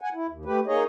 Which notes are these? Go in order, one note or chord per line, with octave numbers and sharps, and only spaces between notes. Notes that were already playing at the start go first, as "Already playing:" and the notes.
F#5 G#5
E4
D#2
A3 G4 B4
A#3 D#4 G#4 C#5 D#5